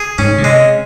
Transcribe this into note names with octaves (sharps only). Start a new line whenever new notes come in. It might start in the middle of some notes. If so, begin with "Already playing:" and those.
Already playing: G#4
G#2 C#4
C3
G#3